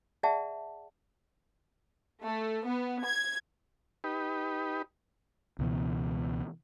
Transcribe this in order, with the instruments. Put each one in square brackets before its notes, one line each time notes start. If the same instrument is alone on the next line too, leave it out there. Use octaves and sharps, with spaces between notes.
[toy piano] G#4 D5 E5 F#5 A5
[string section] A3
B3
G#6
[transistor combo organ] D#4 G4 B4
[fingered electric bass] C#2 B2 E3